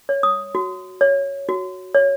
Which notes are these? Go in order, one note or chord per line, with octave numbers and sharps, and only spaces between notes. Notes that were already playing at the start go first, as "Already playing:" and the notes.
C#5
D#6
F#4
C#5
F#4
C#5